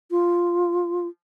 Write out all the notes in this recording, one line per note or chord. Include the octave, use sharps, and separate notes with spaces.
F4